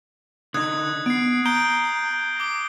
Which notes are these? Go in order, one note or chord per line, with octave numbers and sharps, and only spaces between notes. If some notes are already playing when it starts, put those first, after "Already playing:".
D3 D#4 D#6 F#6 G#6
B3 C7 D7
A#5 G6 D7 G7
D6 G7